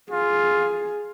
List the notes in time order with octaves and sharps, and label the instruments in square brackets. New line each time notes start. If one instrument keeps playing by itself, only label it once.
[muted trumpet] F4 [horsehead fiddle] G#4